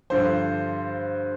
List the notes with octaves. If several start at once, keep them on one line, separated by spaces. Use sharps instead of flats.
G2 D3 F3 C5